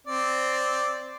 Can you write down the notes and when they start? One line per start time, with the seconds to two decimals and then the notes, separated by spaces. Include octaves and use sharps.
0.07 C4 D5